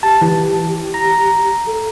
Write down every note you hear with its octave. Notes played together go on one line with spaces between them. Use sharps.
G4 A5
E3
A#5
A4